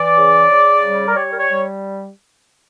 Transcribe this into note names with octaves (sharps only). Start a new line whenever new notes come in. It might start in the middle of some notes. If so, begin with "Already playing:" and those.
Already playing: E3 D5
C#3
C#3
G3
A#4
G3 C#5
A#4
C#5
G3